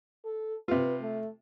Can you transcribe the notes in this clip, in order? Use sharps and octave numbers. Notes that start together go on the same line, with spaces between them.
A4
C3 F4 B4
A3